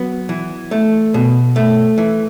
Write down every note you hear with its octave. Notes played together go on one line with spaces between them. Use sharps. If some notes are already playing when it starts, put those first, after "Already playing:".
Already playing: F#3 B3
E3
A3
B2
A3
E3